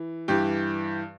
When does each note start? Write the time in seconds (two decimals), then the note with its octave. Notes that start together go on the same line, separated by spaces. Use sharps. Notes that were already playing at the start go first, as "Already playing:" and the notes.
Already playing: E3
0.28 G2 E3 G4